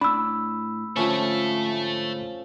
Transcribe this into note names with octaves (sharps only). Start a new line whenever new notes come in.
A2 D4 B5 E6
G#2 D3 F3 A3 C#4 A4 E5